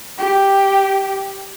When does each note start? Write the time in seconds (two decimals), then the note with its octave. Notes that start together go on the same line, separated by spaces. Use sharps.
0.19 G4